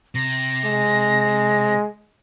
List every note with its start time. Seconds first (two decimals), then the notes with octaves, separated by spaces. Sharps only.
0.15 C3 A#6
0.65 G#3